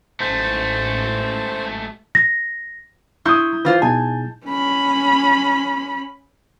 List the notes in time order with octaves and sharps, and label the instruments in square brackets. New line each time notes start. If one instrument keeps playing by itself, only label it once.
[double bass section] A1 [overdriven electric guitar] G#2 A3 [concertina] C5
[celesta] A#6
[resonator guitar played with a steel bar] E4 [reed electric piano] A#5 C6 C#6 [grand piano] D#6 G6
[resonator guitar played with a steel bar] E3 F4 C5 [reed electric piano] B4
[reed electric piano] B2 D#4 G#4 [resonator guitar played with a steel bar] G#5 [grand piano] A5
[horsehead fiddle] C#4 B5